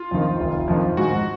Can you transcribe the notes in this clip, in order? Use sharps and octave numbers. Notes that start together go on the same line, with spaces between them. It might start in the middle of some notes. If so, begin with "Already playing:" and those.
Already playing: F4
F2 D#3
F1
F2 D#3
G#2 F#4